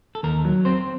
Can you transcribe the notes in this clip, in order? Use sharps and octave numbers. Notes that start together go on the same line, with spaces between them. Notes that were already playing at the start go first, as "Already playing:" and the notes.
A4
D#2 A#4
F#3
C4 C5